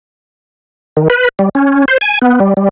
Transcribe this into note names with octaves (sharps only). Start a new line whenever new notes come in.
D#3
B4
G3
C#4
C5
G#5
B3
G3
G3